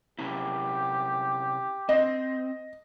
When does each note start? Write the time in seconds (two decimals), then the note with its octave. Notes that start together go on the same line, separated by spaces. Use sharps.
0.19 C3 C#4 E4 G4
1.89 C4 D#5